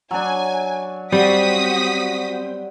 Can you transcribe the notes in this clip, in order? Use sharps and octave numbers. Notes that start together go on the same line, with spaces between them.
F#3 D4 G#5
G3 C4 F#4 D#6 B6